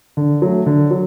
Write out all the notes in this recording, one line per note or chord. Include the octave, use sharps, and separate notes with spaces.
D3
F#3 A3
D3
F#3